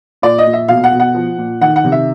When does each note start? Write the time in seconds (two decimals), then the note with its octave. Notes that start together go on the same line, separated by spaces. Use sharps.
0.22 A#2 D5
0.38 D#5
0.46 A#2
0.53 E5
0.68 B2 F5
0.84 F#5
0.92 B2
1.00 F#5
1.15 F3
1.38 A#2
1.61 D#3 F#5
1.76 F#5
1.84 C3
1.92 E5